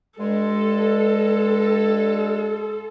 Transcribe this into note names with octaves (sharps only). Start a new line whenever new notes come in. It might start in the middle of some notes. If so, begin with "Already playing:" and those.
G2 G#3 A4